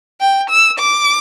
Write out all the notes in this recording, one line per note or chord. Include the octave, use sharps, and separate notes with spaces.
G5
E6
D6